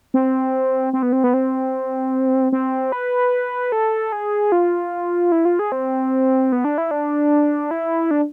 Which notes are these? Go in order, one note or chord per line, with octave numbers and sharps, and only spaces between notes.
C4
C4
B3
C4
B3
C4
C4
B4
A4
G#4
F4
E4
F4
G#4
C4
B3
D4
E4
D4
E4
D4